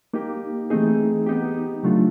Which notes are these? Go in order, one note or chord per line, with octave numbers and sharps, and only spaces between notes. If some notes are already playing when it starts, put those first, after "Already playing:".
A#3 D#4 G4
E3 A3 C4 D#4 G#4
B3 D#4 G4
C#3 F#3 A3 D4 F4